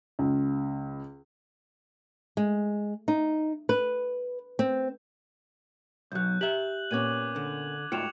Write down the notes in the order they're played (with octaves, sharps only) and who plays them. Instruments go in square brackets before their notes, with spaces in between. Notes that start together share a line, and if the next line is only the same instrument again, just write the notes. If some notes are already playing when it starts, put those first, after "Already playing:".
[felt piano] C#2
[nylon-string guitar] G#3
D#4
B4
C4
[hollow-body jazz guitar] B1 F#3 [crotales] F#6 G6
[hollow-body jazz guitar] G4 E5 [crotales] F#7
[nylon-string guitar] A#2 B3 C#4 [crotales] D6 G#6 D#7
[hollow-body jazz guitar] D3
[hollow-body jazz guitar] G#2 A3 F4 [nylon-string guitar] F#4 G5 [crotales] C#7 E7 F7